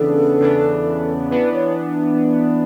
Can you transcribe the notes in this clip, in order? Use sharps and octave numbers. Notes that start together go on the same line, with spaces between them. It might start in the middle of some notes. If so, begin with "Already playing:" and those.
Already playing: E2 C#3 E3 B3 D4 A4
E2 C#3 E3 B3 D4
E3 B3 D4 B4
C#5